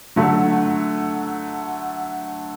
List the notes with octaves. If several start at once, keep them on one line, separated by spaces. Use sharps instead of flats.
D3 F#3 A3